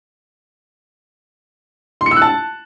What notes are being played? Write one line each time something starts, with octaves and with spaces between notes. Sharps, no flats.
C6
C#7
E6
F#6
A5